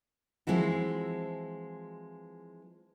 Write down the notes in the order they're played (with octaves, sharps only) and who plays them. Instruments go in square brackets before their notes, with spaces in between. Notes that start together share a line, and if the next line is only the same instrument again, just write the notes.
[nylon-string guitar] E3 F3 G#3 C4 E4 F#4